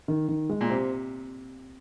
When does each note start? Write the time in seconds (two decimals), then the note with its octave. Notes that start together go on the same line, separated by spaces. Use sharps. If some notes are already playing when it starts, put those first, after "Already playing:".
0.08 D#3
0.28 D#3
0.49 G#3
0.61 A#2
0.70 C3 C4